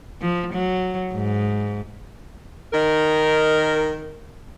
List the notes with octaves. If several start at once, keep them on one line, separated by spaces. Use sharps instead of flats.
F3
F#3
G#2
D#3 A#4